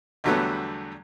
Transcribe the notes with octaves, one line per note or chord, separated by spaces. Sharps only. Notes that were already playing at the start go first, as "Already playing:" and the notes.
E2 D3 F#3 G3 A3 B3